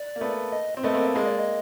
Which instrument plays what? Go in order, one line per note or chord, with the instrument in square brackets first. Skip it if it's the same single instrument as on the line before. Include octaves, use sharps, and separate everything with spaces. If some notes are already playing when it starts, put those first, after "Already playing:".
Already playing: [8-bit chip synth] D5
[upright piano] A#3
A3 B3
[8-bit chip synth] D#5
[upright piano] C4
[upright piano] A3 B3 [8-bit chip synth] D#5
[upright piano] A#3 C4
[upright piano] G#3 A#3 [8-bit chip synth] D#5
[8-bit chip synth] D5
D#5